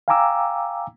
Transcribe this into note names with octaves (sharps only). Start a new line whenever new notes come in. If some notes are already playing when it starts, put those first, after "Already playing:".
F5 G5 G#5 A#5 D6 E6